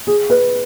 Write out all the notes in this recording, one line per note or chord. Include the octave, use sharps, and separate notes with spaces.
G#4
B4